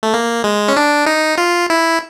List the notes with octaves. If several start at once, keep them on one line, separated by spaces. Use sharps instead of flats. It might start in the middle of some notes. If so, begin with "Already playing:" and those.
A3
A#3
G#3
C#4
D4
D#4
F4
E4